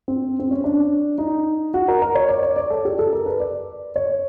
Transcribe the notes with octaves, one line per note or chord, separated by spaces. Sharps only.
C4
C4
C#4
D4
D#4
F#4
A#4
A#4
C#5
D5
C#5
D5
A4
G4
A4
A#4
B4
D5
C#5